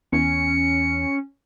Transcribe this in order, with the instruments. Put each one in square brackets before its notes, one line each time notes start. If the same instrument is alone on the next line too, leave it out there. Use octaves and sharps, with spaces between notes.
[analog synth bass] E2 [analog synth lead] C#4 [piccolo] C#7